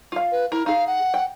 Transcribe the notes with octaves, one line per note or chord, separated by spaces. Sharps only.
F4 F5
B4
E4 A#4
D#4 G#4 F5
F#5
G5